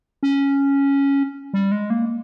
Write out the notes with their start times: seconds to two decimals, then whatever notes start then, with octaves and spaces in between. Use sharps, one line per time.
0.23 C#4
1.54 G3
1.72 G#3
1.90 A#3